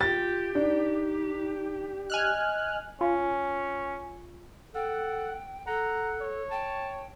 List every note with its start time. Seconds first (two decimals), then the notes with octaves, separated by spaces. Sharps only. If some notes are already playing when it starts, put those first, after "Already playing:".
0.01 F4 G4 A6
0.55 D4 D#4
2.10 D#5 G#5 F6 F#6
3.01 C#4 F4
4.75 A4 F#5 G5
5.67 A4 F#5 A#5
6.21 C#5
6.51 G5 A5